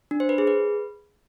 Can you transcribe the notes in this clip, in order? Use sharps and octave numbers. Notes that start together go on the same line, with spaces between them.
D4
C5
B4
G#4
B4